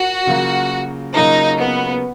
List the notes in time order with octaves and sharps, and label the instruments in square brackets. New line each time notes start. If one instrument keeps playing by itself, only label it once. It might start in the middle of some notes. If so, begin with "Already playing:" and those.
Already playing: [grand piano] F4 A#4 [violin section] F#4
[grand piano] C#3 F#3 A#3 F4 A#4
[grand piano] C#3 F#3 A#3 F4 A#4 [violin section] D#4
[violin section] B3